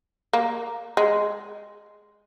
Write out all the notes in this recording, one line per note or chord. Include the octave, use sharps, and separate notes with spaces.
A#3
G#3